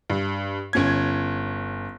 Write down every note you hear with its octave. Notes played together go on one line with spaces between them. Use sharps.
G2
G1 C#4 G#6